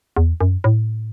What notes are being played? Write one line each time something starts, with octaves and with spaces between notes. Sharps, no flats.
E2
F#2
A2